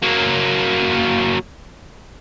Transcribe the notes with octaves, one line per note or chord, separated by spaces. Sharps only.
F#3 A#3